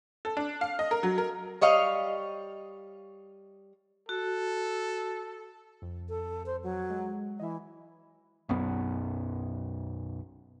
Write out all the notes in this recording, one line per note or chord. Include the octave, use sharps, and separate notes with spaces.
A4
D4
F5
D#5
A#4
F#3
A#4
G3 C#5 D#5 F5
F#4 A4
F2
A4
C5
F#3
G#3
E3 D#5 E5
B1 F#2 B3